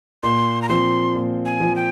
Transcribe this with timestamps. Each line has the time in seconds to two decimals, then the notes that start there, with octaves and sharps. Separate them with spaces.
0.23 A#2 C6
0.62 A#5
0.69 F3 C4 C6
1.15 A#2
1.45 G#5
1.60 F3 C4
1.76 G5